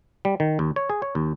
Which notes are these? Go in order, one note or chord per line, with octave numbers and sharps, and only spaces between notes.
G3
D#3
D#2
C#5
G#4
C#5
D#2